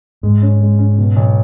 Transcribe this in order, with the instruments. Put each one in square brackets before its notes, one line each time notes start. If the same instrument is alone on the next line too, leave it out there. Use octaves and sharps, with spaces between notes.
[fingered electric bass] G#2 [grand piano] G#3
[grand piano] C#4
G#3
C#4
B2
B1